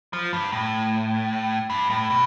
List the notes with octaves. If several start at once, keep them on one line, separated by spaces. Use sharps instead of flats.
F3
G2
A2
G2
A2
B2